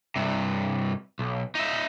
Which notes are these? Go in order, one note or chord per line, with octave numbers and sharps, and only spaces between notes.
G2 C3
B1
D#4 E5